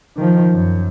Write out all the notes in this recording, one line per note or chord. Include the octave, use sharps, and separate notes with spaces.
D#3 F3
F#2